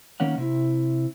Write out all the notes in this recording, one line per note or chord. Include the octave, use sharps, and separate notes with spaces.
D#3 A#3 C#4 F#5
C3 E4